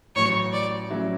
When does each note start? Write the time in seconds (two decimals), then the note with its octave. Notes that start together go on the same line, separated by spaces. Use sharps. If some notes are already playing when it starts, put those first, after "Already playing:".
0.15 A1 A2 F#3 C#5
0.53 D5
0.90 A2 F#3 C#4 E4